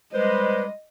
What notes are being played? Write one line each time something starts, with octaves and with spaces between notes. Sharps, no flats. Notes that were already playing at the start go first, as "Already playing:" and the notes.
G3 G#3 B4 C5 D#5